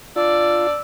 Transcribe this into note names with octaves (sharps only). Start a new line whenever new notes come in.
D4 F4 D5 E6